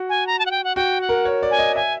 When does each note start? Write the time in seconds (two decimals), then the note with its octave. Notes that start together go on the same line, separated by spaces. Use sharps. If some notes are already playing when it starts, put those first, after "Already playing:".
Already playing: F#4
0.09 G#5
0.27 A#5
0.39 A5
0.46 F#5
0.51 G5
0.64 F#5
0.76 F#4 G5
1.01 F#5
1.09 A#4
1.25 C#5
1.43 D5
1.51 G#5
1.59 D#5
1.76 E5 G#5